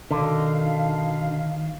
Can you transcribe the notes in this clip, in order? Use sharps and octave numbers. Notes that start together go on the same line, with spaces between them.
B2 D3 D#3 F5